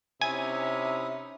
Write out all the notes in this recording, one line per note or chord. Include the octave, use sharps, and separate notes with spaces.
C3 C#4 D#4 E4 E5 G#5 D#6